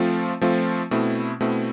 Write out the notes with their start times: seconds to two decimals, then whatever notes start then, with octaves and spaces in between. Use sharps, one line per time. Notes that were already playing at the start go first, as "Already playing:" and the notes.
Already playing: F3 A3 C4 F4
0.41 F3 A3 C4 F4
0.91 B2 A3 C4 E4
1.41 B2 A3 C4 E4